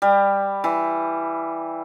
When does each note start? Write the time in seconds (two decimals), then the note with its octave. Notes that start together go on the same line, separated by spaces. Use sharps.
0.02 G3
0.64 E3